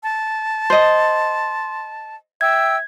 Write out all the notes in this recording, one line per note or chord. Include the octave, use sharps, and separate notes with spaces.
A5
C5 D#5 C6
E5 G5 E6 G#6